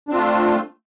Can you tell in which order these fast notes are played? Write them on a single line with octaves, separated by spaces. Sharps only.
D4 C4 F4 A3